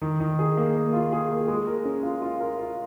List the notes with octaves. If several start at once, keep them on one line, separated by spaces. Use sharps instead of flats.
D#3
D#3
G#4
A#3
A#3
F4
G#4
A#3
G#3
A#4
C#4
F4
F4
A#4
F4